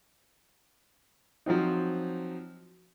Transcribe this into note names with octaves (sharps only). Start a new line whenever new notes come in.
F3 F#3 C4 D#4